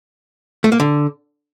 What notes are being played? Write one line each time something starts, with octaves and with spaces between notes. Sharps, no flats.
A3
A#3
D3